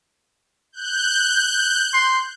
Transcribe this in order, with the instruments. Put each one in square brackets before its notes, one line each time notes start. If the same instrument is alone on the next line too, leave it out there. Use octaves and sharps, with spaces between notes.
[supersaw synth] F#6 G6
[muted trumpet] C6